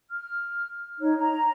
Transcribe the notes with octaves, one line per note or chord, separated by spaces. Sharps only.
F6
D#4 C#5
A#5